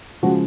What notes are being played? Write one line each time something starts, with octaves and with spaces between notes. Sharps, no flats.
C#3 F3 G#3 F#4